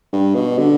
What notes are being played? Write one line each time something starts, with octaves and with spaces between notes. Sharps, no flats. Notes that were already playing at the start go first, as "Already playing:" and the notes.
G2
B2
D3